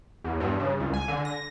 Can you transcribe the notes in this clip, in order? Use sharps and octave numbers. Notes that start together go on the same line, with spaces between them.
E2
G2
C#3
C#2
G#5
D3
A#6